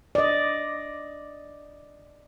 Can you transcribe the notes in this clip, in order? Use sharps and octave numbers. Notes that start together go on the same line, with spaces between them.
D5 D#5